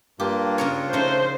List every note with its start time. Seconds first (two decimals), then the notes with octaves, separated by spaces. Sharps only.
0.20 G2 A#3 D4 F4 G4
0.58 C#3 A#4 C#5
0.93 C#3 F3 A3 D#4 C5